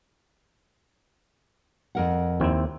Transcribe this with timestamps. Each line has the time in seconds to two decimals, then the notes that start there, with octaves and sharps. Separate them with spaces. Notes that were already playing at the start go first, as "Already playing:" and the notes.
1.95 F2 A#4 F#5
2.40 D#2 C4 E4